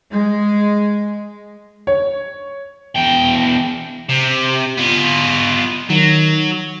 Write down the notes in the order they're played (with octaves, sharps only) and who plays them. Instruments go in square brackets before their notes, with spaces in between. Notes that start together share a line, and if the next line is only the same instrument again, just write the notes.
[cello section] G#3
[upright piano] C#5
[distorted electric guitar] E2 G5
C3
B3 F4
[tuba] D#3 [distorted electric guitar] F#3